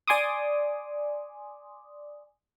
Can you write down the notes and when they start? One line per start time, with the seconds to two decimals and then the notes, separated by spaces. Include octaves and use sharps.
0.08 D5 G#5 C6 D6 D#6